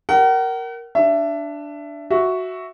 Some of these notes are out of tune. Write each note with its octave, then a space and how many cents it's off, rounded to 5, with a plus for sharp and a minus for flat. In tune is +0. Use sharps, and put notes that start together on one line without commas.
A#4 +0 F#5 +40
D4 +0 E5 +20
F#4 +0 E5 +0